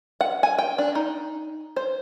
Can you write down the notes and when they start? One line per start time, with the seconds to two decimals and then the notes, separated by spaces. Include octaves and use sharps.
0.21 F#5
0.43 G#5
0.58 G5
0.78 D4
0.95 D#4
1.76 C5